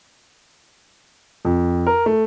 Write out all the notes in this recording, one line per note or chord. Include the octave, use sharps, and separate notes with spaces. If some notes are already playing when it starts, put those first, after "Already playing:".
F2
A#4
A3